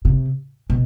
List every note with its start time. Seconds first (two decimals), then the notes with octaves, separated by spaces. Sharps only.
0.05 C3
0.70 B2